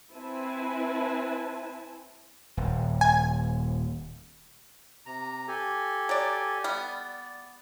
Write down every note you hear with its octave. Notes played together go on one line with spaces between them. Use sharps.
C4 E4 B4 G#5 A5
D#1
G#5
C3 A#5
G4 A4 G#5
F#3 D5
G3 B3 D5